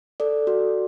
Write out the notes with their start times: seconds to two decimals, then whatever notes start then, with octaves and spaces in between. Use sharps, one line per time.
0.20 A4 D5
0.47 F#4